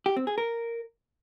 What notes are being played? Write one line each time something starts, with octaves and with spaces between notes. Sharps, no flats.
G4
C4
G#4
A#4